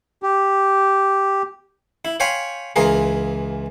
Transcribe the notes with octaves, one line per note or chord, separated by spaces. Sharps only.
G4
E4
C#5 F5 G5 G#5 B5 C6
C#2 E3 F4 G#4 A#4